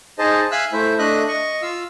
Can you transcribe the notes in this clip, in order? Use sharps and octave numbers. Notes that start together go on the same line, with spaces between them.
D#4 G#4 C5 D#5 A5
E5 F5 G#5 E6 F#6
A3 E4 C5 E5
A3 D4 D#5 E5 F#6
D#5 C#6
F4 F5 E6